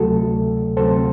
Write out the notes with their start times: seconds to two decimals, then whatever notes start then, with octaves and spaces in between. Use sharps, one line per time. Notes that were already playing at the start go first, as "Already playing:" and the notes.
Already playing: D2 C3 F#3 A3 F#4 A4
0.77 D2 C3 F#3 A3 C4 A4 C5